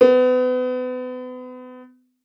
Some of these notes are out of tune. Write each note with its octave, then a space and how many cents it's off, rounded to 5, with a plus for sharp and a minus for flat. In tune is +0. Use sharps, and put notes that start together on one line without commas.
B3 +35